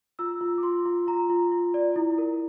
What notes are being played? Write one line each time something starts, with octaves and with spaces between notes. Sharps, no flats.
F4 E6
F4
D6
F4 C6
F4
F4 A#5
F4
F4
D5
E4
A#4